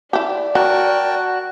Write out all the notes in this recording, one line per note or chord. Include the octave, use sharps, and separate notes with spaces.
E4 G4 D5
F#3 F#4 A#4 G5 A5